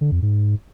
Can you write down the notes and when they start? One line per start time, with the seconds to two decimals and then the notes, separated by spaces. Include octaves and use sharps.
0.01 D3
0.12 F2
0.22 G#2